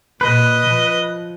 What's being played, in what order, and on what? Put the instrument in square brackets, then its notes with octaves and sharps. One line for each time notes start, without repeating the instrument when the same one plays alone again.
[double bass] A#2 [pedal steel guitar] B4 [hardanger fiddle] D#5
[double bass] F3